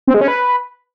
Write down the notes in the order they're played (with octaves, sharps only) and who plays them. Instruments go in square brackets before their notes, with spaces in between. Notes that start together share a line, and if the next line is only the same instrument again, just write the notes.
[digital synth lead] C4
G#3
C#4
B4